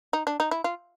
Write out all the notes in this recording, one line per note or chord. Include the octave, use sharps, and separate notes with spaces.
D#4
D4
D#4
E4
F4